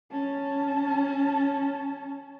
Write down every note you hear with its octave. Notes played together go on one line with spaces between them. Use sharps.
C#4 A5